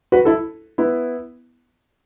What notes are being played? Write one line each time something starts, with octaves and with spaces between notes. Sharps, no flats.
F#4 B4
E4 A4
B3 E4